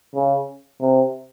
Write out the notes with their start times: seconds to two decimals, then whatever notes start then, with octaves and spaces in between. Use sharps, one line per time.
0.15 C#3
0.81 C3